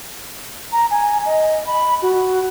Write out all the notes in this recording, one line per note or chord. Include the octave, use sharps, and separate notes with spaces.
A#5
G#5
D#5
B5
F#4